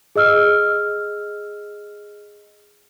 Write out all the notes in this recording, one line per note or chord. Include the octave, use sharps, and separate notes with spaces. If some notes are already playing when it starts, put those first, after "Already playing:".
G#4 D#5 E6 F6